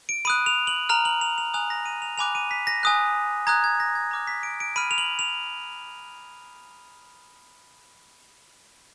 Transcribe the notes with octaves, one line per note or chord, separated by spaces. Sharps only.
D7
B5 D#6 F#6 D#7
F7
F#7
A#5 F6 F7
F#7
F7
F7
G#5 D#6 F#6 F7
A#6
D#7
F7
G#5 B5 D6 F#6 F7
D#7
B6
A#6
G#5 D#6 F#6
A#5 D#6 F#6 G#6
G#6
A#6
G#6
A#5 D6 F6
B6
D7
D7
B5 F6 D#7
F7
F#7
F7